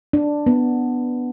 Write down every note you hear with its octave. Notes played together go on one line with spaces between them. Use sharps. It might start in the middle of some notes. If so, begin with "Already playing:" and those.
D4
B3